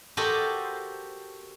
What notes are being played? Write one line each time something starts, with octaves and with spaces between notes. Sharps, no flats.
F#4 G4 A4 A#4 C5 D#5